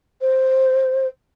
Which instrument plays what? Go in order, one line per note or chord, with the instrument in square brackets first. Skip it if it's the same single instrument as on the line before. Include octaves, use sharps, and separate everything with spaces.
[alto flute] C5